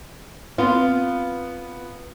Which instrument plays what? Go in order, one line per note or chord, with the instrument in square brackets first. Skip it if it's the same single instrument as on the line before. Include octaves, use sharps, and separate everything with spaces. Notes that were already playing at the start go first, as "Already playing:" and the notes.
[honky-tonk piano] B3 [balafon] C4 C6 [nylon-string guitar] F4